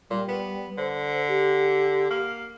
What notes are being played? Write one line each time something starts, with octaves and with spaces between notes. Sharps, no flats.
A#2 G3
B3
D3 C5
G4
A#3